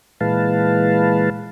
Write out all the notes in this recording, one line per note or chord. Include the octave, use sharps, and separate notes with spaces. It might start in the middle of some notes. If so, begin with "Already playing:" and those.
A#2 E3 G#3 B4 F5 A5